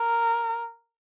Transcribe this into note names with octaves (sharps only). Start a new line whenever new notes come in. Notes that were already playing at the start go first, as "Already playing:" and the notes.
Already playing: A#4